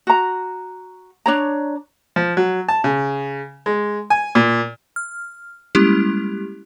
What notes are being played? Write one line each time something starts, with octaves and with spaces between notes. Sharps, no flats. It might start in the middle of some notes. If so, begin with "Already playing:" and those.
F#4 A#5
D4 C#5 A#5
F3
F#3
A5
C#3
G#3
G#5
A#2
F6
G3 G#3 A#3 C#4 E4 G4